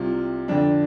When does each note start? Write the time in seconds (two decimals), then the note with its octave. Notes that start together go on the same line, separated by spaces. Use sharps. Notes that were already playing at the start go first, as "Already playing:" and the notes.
Already playing: C2 C3 F4
0.48 F2 D3 D4